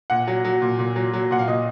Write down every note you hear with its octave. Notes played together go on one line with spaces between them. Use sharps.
A#2 F#5
F#3
F#3
A#2
A#2
F#3
F#3
A#2 F#5
F5
A#2 D#5